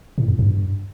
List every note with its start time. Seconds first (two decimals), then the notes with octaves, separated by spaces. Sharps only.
0.18 A2
0.28 E2
0.39 G2